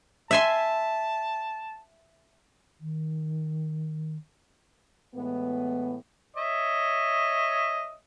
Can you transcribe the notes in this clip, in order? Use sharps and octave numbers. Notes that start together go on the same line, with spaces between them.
E5 G#5 A5 C6
D#3
A2 E3 G#3 B3
C#5 D#5 E5